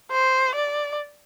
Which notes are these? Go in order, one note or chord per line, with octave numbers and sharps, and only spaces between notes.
C5
D5